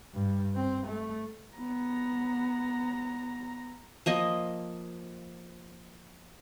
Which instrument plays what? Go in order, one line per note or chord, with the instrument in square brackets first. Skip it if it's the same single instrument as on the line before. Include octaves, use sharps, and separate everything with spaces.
[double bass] G2
C4
A3
[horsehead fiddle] B3 A#5
[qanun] F3 A#3 D#5